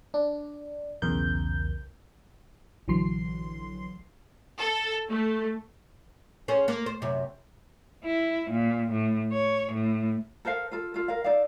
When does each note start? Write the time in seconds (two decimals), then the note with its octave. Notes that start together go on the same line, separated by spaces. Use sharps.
0.14 D4
1.02 B1 E2 C#3 A#4 G6
2.88 A#1 D3 E3 F#3 C6 C7
4.60 A4
5.11 A3
6.48 C#4 G#4 C5
6.68 A#3
6.86 C5
7.02 F#2 C3
8.04 E4
8.50 A#2
8.91 A2
9.33 C#5
9.73 A2
10.45 A4 A#4 C5 F5
10.71 F4 A4
10.94 F4 A4
11.08 A#4 F5
11.24 D#4 A4 D5 F5